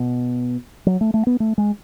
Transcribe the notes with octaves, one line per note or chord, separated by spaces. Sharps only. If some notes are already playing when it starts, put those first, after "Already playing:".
Already playing: B2
F#3
A3
A3
B3
A3
G#3